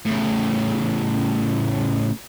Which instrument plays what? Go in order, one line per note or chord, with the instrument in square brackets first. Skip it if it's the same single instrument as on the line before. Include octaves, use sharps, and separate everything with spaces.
[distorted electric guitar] A2 C#3